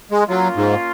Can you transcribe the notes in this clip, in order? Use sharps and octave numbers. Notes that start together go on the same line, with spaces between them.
G#3
F#3 A#3 C#4 F4
G#2